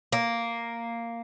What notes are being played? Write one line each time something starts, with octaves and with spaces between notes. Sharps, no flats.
A#3